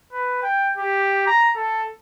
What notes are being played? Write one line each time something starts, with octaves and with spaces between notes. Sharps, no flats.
B4
G5
G4
A#5
A4